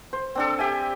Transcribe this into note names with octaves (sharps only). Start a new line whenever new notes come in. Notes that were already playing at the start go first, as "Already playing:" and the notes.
C5
C4 D4 A4
G4 E5 G#5